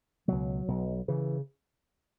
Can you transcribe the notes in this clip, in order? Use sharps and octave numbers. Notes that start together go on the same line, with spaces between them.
C#2 B2 F#3
B1 B2
C#3 E3